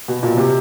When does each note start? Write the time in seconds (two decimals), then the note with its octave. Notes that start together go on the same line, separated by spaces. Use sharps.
0.08 B2
0.23 A#2
0.37 C3